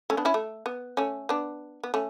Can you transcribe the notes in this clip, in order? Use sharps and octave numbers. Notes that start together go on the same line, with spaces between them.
A3 C#4
B3 D4
C#4 E4
A3
B3
A3 C#4
B3 D4
B3
A3 C#4